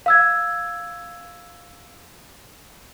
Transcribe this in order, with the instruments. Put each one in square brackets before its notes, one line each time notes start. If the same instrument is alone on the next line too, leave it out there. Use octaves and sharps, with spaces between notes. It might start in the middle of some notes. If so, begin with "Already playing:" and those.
[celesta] F5 E6 G#6